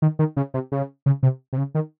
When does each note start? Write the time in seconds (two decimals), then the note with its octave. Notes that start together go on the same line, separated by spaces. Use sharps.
0.02 D#3
0.19 D#3
0.37 C#3
0.54 C3
0.72 C#3
1.06 C#3
1.23 C3
1.53 C3
1.58 C#3
1.75 D#3